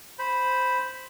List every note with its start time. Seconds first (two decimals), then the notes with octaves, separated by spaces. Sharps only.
0.19 C5 B5